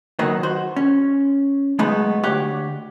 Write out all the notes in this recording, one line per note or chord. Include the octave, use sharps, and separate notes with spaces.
D#3 F#3 A#3 B3 D#4
F#4 C5
C#4
B1 G#3 A3 B3 D#4
D2 G4 C#5 F#5